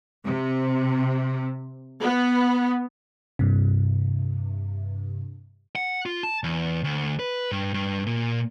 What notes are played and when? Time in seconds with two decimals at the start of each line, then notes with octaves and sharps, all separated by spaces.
0.24 C3
2.01 B3
3.39 G2 C3
5.76 F#5
6.06 F4
6.23 A5
6.44 E2
6.84 D2
7.19 B4
7.52 G2
7.74 G2
8.06 A#2